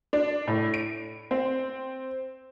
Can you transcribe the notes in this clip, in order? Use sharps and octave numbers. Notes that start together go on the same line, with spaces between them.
D4
A2
D7
C4